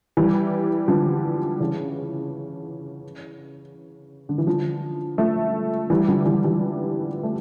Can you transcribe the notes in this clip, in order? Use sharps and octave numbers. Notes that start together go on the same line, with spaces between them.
E3 G3
D3 F3
C#3 E3
D3
E3
D3 F3
F3 A3
E3 G3
D3 F3
E3 G3
E3 G3
A3